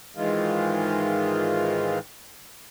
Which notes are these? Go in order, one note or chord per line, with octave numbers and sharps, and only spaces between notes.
G#2 D#3 E3 G#3 F4